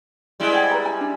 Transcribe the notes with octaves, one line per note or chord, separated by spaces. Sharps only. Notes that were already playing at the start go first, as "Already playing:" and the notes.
G3 G#3 E4
C5 F#5 G5
B4 A#5
G#5
D4